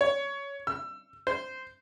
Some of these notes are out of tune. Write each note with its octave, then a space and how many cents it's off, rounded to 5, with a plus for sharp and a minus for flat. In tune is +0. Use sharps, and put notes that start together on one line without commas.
C#5 +15
E6 +25
C5 -10